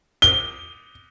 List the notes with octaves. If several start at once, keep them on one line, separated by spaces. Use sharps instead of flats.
G7